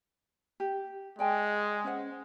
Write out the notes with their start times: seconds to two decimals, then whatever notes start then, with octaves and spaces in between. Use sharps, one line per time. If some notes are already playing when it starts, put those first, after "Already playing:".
0.60 G4
1.19 G#3 D5 G5 G#5
1.84 C#4 C5 F#5